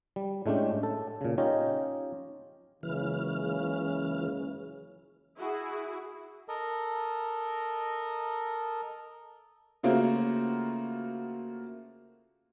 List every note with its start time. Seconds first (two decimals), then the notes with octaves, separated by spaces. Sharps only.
0.16 G3
0.46 A2 G#3 A3 C#4 D4 G4
0.83 A4
1.21 A#2 C#3
1.38 C#4 D#4 F4 G4 C#5 D#5
2.83 F#1 C#2 C#3 E3 F6
5.38 E4 F#4 G#4
6.48 A4 A#4 D#5
9.83 C#3 A3 A#3 F4 F#4 C5